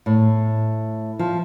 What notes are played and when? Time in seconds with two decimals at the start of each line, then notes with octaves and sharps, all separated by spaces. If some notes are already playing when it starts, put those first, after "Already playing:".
0.06 A2
1.19 F3